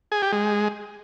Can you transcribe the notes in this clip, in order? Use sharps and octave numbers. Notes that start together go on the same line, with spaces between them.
G#4
G4
G#3